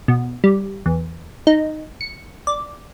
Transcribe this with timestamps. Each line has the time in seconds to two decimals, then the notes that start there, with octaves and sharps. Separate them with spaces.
0.08 B2
0.44 G3
0.86 E2
1.47 D#4
2.01 C#7
2.47 D5